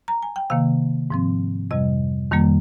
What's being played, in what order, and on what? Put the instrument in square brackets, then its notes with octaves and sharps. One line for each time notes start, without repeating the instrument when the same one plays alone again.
[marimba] A#5
G#5
G5
C3 D#3 A#3 F5
G#2 F3 C4
F2 C3 G3 D#5
F2 D#3 G3 A#3